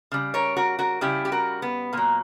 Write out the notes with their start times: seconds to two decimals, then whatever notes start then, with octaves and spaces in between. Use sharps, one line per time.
0.12 C#3 G3
0.34 A#4 C#5
0.57 F#4 A#4
0.79 F#4 A#4
1.01 C#3 G3 E4 G4
1.25 G4
1.32 F#4 A#4
1.62 B3
1.93 A#2 F#3 A#3